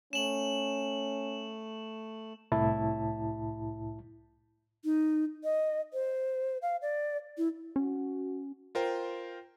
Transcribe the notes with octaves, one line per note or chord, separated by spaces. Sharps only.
A3 C#4 E7 F#7
C2 A2 E4 A5
D#4
D#5
C5
F5
D5
E4
C#4 F#4
F4 A#4 C5 G5